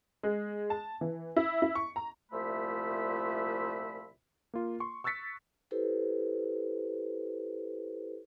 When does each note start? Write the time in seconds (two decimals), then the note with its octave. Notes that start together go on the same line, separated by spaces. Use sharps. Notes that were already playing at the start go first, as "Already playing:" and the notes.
0.23 G#3
0.70 A5
1.01 E3
1.36 E4
1.62 E4
1.75 C#6
1.96 A#5
2.32 C2 A#2 F3 A3 E5 B5
4.54 A#3 F4
4.80 C6 C#6
5.04 C#6 E6 F#6 A6 B6 C#7
5.71 E4 G4 A4 B4 C5